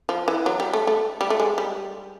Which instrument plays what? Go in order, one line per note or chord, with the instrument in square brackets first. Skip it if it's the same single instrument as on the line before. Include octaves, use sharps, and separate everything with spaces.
[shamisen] F3
E3
F#3
G3
A3
A3
G3
A3
G#3
G3